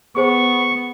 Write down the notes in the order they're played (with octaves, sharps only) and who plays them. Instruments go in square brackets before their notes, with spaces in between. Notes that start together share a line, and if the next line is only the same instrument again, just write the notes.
[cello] B3 [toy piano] G#4 C5 G#5 [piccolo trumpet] C#6